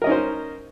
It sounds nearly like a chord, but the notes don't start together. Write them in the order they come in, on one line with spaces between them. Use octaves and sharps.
A#4 D#5 C#4 D#4 C5